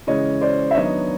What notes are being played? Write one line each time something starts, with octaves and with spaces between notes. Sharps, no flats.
C#3 E3 G#3 C#4 C#5 D#5
C5 D5
E5
D#3 F#3 B3 D4 C#5 D#5